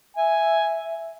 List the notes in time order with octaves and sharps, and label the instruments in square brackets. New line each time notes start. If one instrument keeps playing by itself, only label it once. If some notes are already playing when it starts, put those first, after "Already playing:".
[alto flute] E5 [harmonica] G#5